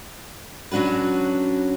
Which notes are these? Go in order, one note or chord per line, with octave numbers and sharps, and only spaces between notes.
F#3 C#4 D4 F#4 B4